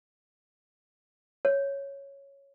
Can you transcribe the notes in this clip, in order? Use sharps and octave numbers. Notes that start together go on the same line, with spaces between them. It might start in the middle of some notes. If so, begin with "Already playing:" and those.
C#5